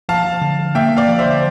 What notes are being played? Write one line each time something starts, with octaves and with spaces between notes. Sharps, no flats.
F3 F5 A5
F3
D3
D3
A#3 E5 G5
A#3
D5 F5
F3
C5 E5
D3